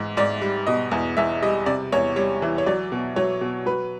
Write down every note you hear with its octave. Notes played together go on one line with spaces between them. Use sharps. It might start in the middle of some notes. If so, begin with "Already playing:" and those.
Already playing: G#2 E3
G#2 D5
G3
B2 D#5
E2
E2 E5
G3 D#5
C3 D5
E2 C#5
G3 C#5
E3
C#5
F#3 D5
B2
F#3 C#5
B2
F#3 B4